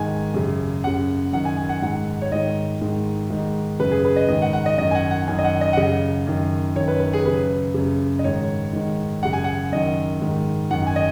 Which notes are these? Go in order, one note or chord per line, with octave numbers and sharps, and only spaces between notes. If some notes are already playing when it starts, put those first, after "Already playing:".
Already playing: G#2 D#3 G#5
F#2 C#3
F#2 C#3 F#5
F#2 D#3 F#5
G#5
G#5
F#5
G#2 D#3 F#5
C#5
G#2 D#3 D#5
G#2 D#3
G#2 D#3
F#2 C#3 B4
G#4
B4
D#5
G#2 D#3 D#5
F#5
F#5
D#5
F#2 D#3 D#5
G#5
F#5
F#5
F#2 D#3 G#5
D#5
F#5
D#5
F#5
F#2 C#3 D#5
F#2 D#3
F#2 D#3 C#5
B4
B4
G#4
F#2 C#3 B4
F#2 C#3
D#5
G#2 D#3 C#5
G#2 D#3
F#2 C#3 F#5
G#5
F#5
F#2 D#3 D#5
G#2 D#3
F#2 D#3 F#5
G#5
D#5